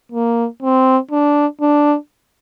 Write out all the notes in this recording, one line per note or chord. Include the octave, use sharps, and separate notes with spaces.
A#3
C4
D4
D4